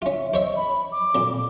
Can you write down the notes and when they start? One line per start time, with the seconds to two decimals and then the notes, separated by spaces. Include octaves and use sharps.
0.02 C#4 F4 E5
0.34 C5 C#5 D#5 E5
0.56 B5
0.92 D6
1.15 F2 A#2